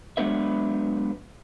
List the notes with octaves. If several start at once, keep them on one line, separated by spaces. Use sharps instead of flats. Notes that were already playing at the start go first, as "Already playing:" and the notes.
F#3 G#3 B3 D4 B4 E5